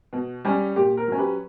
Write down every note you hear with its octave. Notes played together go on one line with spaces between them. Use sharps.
B2
G3 C#4
A#2 G4
A#4
F#3 C#4
G4 B4